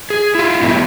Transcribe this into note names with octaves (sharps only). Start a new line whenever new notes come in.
G#4
E4 F4
E3 F#3 G3 A3 B3